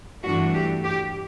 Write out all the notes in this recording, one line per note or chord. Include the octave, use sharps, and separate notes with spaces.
G2 E3 A3 D4 F#4
G4
G4